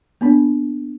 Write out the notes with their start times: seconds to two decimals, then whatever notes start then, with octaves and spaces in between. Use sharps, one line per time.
0.21 A#3 B3 D4